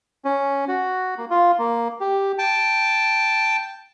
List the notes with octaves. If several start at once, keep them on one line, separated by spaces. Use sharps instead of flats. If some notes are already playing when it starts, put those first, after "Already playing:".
C#4
F#4
A#3
F4
A#3
G4
G5 A5